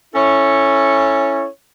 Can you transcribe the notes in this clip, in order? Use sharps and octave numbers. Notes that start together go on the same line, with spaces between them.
C#4 E4 A4 C#5